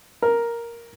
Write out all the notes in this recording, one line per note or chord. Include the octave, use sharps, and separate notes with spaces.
A#4